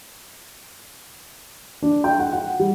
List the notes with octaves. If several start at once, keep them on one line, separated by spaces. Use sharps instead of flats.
D4
G5
F#5
F#5
G3